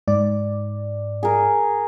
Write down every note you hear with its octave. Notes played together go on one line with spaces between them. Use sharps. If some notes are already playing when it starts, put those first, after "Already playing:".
G#2 D5
G#4 A#4